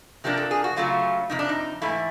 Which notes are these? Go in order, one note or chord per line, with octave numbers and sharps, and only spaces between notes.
C3 F3 A#3 D4 G4
A4
G#4
F#4
C#3 F#3 A3 C#4 F4
F2 C3 D#4
D4
D#4
G#2 E3 A3 E4